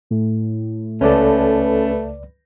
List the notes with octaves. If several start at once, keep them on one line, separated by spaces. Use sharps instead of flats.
A2
C#2 A3 C#4 A4 B4 D5